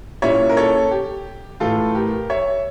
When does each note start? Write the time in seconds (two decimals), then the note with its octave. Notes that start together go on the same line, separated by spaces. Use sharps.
0.22 A#2 G3 C#4 E4 C#5 E5
0.49 A#4
0.57 A4 C#5
0.91 G4
1.60 A2 E3 A3 F4 A4
1.95 G4 A#4
2.30 C#5 E5